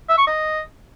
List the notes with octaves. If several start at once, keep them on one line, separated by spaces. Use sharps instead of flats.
E5
C#6
D#5